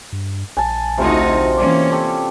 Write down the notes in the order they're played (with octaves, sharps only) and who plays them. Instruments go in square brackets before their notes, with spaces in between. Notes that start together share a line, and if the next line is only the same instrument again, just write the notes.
[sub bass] G2
[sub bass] A#1 [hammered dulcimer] G#5 A5
[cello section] D2 D#4 F#4 [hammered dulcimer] C3 F4 C5
[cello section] E3 A#3 C#4 [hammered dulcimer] D5
[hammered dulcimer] G4 A4